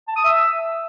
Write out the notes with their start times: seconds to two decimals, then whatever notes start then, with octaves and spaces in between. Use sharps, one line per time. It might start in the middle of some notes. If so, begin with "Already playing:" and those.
0.08 A5
0.16 D#6
0.24 E5